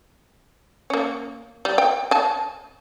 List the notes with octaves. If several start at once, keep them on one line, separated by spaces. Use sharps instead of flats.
A#3 C#4
G3
G5
G#5 A5